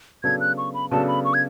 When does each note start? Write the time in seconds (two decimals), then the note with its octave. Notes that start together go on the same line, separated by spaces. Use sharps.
0.23 C#3 F#3 B3 D4 A4 G#6
0.40 F#6
0.58 C#6
0.74 B5
0.91 C#3 F#3 B3 D4 A4 A5
1.08 B5
1.25 C#6
1.34 G#6